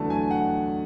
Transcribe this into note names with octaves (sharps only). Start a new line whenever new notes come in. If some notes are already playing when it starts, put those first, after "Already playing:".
Already playing: E2 D3 F#3 A3 A5
G#5
F#5